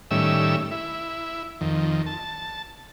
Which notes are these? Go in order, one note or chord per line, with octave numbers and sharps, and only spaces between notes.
A2 D#3 G3 C#4 E5 E6
E4
F2 D#3
A5